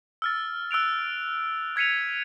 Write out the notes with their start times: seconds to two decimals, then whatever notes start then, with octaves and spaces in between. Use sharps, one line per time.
0.22 E6 F6 A6
0.71 E6 F#6 D7 F7
1.76 E6 G#6 B6 C#7 D#7 F7